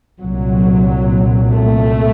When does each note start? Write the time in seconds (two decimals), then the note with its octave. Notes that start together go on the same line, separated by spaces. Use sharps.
0.20 C2 A#2 F#3
1.52 A3